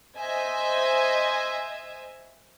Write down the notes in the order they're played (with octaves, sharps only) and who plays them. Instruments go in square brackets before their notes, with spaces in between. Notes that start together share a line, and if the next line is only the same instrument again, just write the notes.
[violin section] C5 D#5 E5 G#5